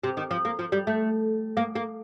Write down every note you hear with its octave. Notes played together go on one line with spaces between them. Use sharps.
C3
D#3
F3
A#3
F3
G3
A3
A#3
A#3